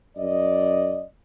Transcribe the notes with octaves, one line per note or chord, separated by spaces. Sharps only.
F#2 D5 D#5